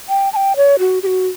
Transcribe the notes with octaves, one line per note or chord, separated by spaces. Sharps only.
G5
A5
G5
C#5
F#4
G4
F#4